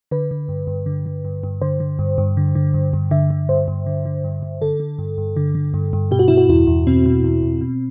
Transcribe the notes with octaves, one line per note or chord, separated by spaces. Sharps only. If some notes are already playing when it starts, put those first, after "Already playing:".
D3 B4
D3
G2
G2
D3
D3
G2
G2
D3 C5
D3
G2
G2
D3
D3
G2
G2
D3 E5
D3
G2 C5
G2
D3
D3
G2
G2
D3 A4
D3
G2
G2
D3
D3
G2
G2
B2 G4
F#4
B2 E4
F#4
E2 E4
E2
B2 C4
B2
E2
E2
B2